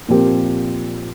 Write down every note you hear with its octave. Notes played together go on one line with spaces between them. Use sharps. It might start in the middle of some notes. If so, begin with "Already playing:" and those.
A#2 F3 C4 G4 A#4